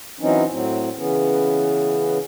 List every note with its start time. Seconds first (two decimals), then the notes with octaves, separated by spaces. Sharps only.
0.20 E3 F#3 C4 C#4 D#4
0.50 A2 F#3 C4
0.96 C#3 E3 B3 C#4